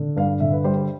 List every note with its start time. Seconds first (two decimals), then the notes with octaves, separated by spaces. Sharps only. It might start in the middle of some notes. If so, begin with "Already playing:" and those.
Already playing: D3
0.16 G2 F5
0.40 D3 E5
0.52 B4
0.64 G3 C5
0.77 C5